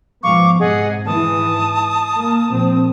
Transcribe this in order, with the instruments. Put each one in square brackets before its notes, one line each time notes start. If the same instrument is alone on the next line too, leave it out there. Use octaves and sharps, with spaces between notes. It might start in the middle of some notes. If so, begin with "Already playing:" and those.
[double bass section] G#2 F3 B3 [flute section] F5 C#6 D6
[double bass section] G#2 C3 [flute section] G#4 D#5 F#5
[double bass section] G#2 E3 [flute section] A5 D#6
[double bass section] A#3
A#1 C4